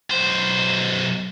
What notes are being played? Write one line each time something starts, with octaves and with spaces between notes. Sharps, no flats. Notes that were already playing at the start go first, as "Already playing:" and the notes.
B1 C5